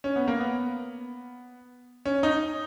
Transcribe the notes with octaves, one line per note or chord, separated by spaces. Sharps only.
C#4
B3
A#3
B3
C#4
D#4